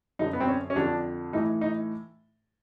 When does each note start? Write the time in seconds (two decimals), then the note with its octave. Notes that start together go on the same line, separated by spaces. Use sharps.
0.19 F#2 D3 D#4
0.33 B3
0.41 C4
0.48 C#4
0.70 C#4
0.76 F2 D3 D4
1.33 A2 E3 D#4
1.61 D#4